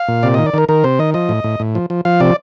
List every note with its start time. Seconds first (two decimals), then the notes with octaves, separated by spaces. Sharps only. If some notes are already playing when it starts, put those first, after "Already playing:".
Already playing: F5
0.08 A#2
0.23 C3 D5
0.34 D#3 D#5
0.46 D5
0.54 D#3 A#4
0.69 D#3 A#4
0.84 C3 C5
0.99 D#3 D#5
1.14 F3 D#5
1.29 A2
1.44 A2
1.60 A2
1.75 F3
1.90 F3
2.05 F3 F5
2.20 C3 D5